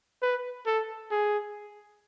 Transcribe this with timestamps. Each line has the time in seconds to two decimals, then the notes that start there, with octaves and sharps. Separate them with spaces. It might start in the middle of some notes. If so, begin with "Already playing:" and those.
0.22 B4
0.66 A4
1.11 G#4